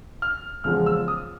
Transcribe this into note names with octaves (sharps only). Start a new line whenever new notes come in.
F6
E2 C#3 F3 G#3 B3 F6
E6
D#6